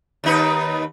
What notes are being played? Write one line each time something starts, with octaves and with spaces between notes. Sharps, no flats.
D#2 D#4 B4